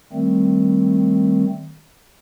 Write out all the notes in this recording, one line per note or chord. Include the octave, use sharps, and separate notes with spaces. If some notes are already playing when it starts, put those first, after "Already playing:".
D#3 G3 A3 C4